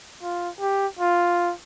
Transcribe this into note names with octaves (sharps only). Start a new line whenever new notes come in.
F4
G4
F4